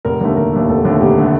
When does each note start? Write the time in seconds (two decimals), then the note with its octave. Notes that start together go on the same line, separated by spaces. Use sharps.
0.05 F1 A#4
0.21 D#2 D3 A3
0.37 F1 A#4
0.53 D#2 D3 A3
0.69 F1 A4
0.85 D#2 D3 A3
1.01 F1 G4
1.18 D3 A3